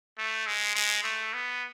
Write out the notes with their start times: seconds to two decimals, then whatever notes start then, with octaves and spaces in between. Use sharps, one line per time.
0.18 A3
0.46 G#3
0.75 G#3
1.04 A3
1.33 B3